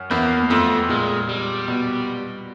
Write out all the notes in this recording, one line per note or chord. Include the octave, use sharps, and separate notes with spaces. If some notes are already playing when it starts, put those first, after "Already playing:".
Already playing: F#2
E2 A#3
F2 A3
A#2 G#3
G3
B2